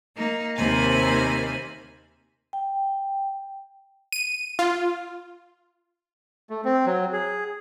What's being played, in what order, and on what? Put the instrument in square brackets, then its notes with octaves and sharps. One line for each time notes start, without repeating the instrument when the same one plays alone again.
[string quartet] A#3 D#4
D#2 C3 A#3 C5 G#5 B5
[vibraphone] G5
[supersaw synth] D#7
F4
[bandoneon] A3
C4
F#3
G#4